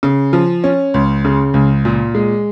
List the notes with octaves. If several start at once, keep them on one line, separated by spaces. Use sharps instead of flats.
C#3
F3
C#4
C#2
C#3
C#2
A#2
G#3